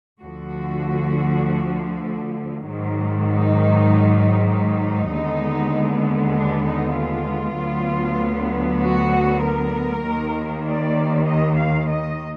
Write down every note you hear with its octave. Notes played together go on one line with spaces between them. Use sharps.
D2 D3 F3 F#4
G#2 D#3 F#3
D#4
D#4
D#2 D3 G#3 B3
D4
D#4
F4
D2 D3 F#3 B3
F#4
A#4
D#2 D#3 A#3
D5
D#5
F5
D#5